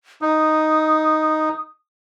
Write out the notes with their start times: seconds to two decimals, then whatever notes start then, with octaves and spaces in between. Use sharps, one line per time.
0.22 D#4 D#6